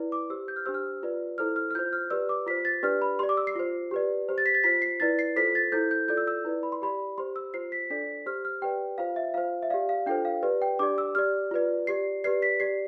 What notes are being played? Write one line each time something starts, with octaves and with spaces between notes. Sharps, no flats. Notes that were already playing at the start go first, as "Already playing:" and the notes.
Already playing: E4 B4 D5
D6
G4 C5 E6
G6
F6
D4 G4 C5 E6
F6
F4 B4 D5
E4 A4 C5 F6
F6
F6
F4 C5 G6
F6
G4 B4 D5 E6
D6
F4 C5 B6
A6
D4 G4 B4 D5 F6
B5
G4 D5 C6
D6
E6
C7
F4 C5
G4 B4 D5
G4 C5
A6
B6
A6
F4 C5 B6
C7
E4 B4 D5 A6
C7
F4 A4 C5 B6
A6
E4 A4 C5 G6
G6
F4 A4 D5 G6
E6
E6
E4 B4 D5
B5
C6
G4 D5 B5
G4 C5 C6
E6
F4 C5 C7
B6
D4 A4 D5 B6
G4 C5 F6
F6
G4 B4 D5 G5
F4 C5 F5
E5
F4 C5 F5
E5
G4 D5 F5
F5
D4 F4 A4 C5 G5
F5
G4 B4 D5
G5
D4 G4 D5 D6
E6
G4 D5 F6
F4 B4 D5
G4 D5 C7
G4 B4 D5 C7
B6
G4 D5 C7